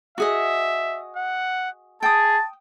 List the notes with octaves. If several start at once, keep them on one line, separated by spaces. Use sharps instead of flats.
F#4 G#4 D#5 E5
F#5
G#4 G5 A5 D#6